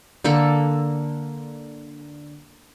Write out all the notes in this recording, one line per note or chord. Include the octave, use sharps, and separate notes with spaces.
D3 A#3 A4